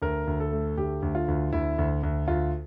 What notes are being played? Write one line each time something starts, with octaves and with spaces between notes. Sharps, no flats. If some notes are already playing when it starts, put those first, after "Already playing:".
D2 A#4
D2
A4
A3
D2 G4
D2
F4
D2
D2 E4
D2
D2
D2 F4